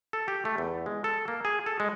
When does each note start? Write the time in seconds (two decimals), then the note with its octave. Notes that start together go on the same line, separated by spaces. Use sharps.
0.13 A4
0.28 G4
0.45 A3
0.58 E2
0.86 G#3
1.04 A4
1.28 A#3
1.45 G#4
1.66 A4
1.80 G#3